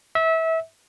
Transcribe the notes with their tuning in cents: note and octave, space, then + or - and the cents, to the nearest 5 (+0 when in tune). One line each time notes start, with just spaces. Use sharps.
E5 -25